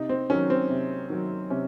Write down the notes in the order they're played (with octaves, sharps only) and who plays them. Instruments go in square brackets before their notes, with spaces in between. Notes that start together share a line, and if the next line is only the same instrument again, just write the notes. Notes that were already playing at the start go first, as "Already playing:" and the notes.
Already playing: [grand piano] C3 D#4
C4
D#3 F#3 C#4
C4
C3
D#3 F#3
C3 C#4